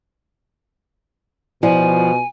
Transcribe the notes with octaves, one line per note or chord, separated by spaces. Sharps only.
B2 F3 E4 D5 G#5